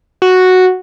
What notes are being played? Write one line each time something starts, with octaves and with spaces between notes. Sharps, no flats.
F#4